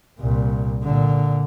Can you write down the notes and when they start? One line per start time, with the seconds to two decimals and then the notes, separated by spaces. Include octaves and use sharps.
0.19 C2 A#2
0.83 A#2 D3